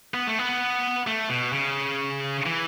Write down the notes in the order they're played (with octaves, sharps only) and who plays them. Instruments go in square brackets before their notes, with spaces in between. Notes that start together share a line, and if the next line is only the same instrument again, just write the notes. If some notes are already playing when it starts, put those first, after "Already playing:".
[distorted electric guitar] B3
A3
B3
A3
B2
C#3
E3